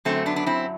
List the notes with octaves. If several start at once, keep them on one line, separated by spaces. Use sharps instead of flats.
F#2 D3 F#3 A3 C4
B3 D4
D4
C4 E4